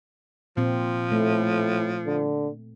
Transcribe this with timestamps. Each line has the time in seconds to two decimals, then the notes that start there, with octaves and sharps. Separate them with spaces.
0.57 A#2 F3 C4
1.12 A2 A3
2.07 D3